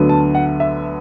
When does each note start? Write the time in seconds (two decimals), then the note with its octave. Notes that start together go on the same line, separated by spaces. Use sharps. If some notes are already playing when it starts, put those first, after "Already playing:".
Already playing: D2 D3 F#3 B3
0.09 A5
0.35 F#5
0.60 E5